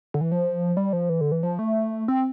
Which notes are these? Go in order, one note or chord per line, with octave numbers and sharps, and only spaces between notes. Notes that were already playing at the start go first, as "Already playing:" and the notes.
D3
E3
F3
G3
F3
E3
D3
E3
F3
A3
C4